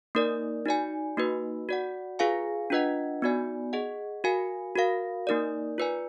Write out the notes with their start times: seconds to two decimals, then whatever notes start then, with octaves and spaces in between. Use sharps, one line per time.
0.15 A#3 D#4 A#4 D5
0.65 D#4 F#4 D5 G#5
1.17 A#3 D#4 F#4 B4
1.69 F#4 D5 F#5
2.19 F4 G#4 B4 F5 G#5
2.70 D4 F4 B4 D#5 F#5
3.22 B3 D#4 F#4 D5 G#5
3.73 G#4 D#5 F#5
4.24 F#4 A#4 F5 G#5
4.76 F#4 A#4 F5
5.27 A#3 D#4 A#4 D5
5.78 F4 B4 D5 G#5